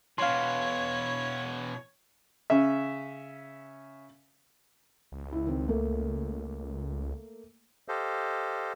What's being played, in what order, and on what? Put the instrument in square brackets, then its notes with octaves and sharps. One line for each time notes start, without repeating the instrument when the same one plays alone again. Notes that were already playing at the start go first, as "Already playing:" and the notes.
[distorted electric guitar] B2 E3 [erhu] C#5 [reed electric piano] F5 C6
[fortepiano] C#3 C#4 E5
[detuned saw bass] C#2
[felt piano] E4
D#3 C4
A3 A#3
[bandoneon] G4 A4 C5 D#5 F5